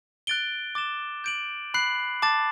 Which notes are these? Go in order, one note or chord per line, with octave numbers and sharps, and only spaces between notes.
F#6 A6 D7 G7
D6 A6 E7 G7
G6 D7 F#7
B5 F#6 C7 F#7
A5 D6 A6